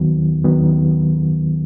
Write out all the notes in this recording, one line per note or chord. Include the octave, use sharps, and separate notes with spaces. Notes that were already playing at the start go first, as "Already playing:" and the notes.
Already playing: D#2 D#3 F#3 B3
D#2 D#3 F#3 B3